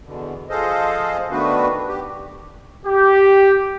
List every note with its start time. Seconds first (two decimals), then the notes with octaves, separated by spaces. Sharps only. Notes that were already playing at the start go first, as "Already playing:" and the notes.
0.05 E2 B2 D3
0.49 F3 G#4 A4 C5 D#5 F5
1.31 D#3 A3 B3 D4 F#4 B4
1.87 G4
2.85 G4